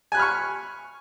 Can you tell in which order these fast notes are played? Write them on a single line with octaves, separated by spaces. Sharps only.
G#5 F#6 B5 F6 C#6